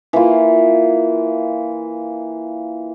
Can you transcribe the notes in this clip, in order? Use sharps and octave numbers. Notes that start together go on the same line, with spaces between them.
E3 A#3 F4